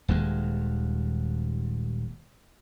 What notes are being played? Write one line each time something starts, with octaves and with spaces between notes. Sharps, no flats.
D#1 D#2 G#3